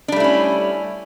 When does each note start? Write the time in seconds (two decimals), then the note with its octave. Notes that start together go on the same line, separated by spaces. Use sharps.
0.08 D4
0.12 G3
0.16 A3
0.20 E4
0.24 C#4